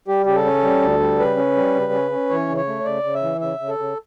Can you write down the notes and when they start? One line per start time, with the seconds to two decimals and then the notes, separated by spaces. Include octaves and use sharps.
0.08 G3 G4
0.26 C#3 G4
0.36 A4
0.45 C#4
0.63 G3
0.82 D2
1.00 G3
1.19 C#3 B4
1.37 C#4
1.56 G3
1.75 C#3
1.92 C#4
2.11 C#4
2.30 E3 C#5
2.49 C#3
2.57 C#5
2.68 A3
2.85 C#3 D5
3.04 C#3
3.14 E5
3.22 E3
3.41 C#3 E5
3.60 C#3
3.69 A4
3.79 C#3